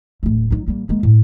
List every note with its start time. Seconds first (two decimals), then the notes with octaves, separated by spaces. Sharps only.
0.23 D1 A3
0.51 F#3 D#4
0.68 G3 A#3
0.89 G#3 A#3
1.03 A2